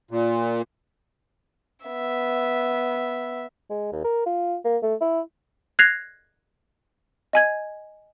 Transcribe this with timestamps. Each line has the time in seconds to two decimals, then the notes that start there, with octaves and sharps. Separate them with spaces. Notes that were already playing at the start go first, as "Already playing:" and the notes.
0.11 A#2
1.86 B3 E5
3.70 G#3
3.92 D#2
4.04 A#4
4.26 F4
4.65 A#3
4.83 A3
5.01 E4
5.79 F#6 G#6 A#6 C7 F7
7.33 D#5 G#5 G#6